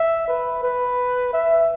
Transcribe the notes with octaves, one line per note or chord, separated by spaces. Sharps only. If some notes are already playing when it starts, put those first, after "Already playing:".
Already playing: E5
B4
B4
E5